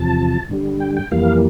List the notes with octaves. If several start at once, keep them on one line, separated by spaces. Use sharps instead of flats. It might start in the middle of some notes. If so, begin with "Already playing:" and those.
Already playing: E2 C3 F3 A5
G2 D3 G3
G5
G5
F2 E3 G3 A#3 F5